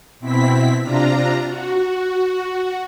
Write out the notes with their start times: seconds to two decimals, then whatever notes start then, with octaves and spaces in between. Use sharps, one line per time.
0.20 B2 C4 E4 B6
0.82 C3 D4 F4 A#5
1.47 F#4